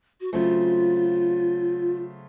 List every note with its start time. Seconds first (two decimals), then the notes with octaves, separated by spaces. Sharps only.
0.20 F#4
0.33 C#3 F#3 A3 C4 F4